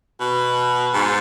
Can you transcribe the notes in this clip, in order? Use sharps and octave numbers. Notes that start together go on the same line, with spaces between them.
B2
G#2